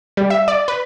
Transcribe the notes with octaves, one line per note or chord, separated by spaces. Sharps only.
G3
E5
D5
B4